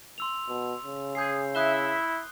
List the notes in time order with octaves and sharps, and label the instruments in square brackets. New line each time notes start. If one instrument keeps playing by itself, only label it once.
[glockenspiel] C6 E6 F7
[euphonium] B2
C#3
[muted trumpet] G#4 [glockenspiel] G6 C7
[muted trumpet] E4 [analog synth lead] E5 [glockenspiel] D#6 F#6 G7